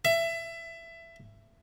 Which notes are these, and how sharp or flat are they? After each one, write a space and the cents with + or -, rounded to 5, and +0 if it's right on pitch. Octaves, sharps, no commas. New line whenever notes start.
E5 +20